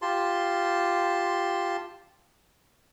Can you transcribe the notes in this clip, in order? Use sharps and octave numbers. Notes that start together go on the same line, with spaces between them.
F4 G4 A5 C6